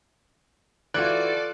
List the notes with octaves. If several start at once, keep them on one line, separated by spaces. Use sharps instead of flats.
E3 F4 F#4 A4 D5 F#6